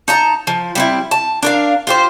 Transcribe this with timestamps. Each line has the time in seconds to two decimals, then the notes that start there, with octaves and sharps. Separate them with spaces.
0.08 D#4 A5 A#5
0.47 F3
0.75 G3 C4 E4
1.11 A5
1.43 D4 A#4 F5
1.87 F4 G4 C5